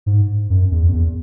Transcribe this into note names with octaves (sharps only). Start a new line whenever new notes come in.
G#2
F#2
E2
F#2
E2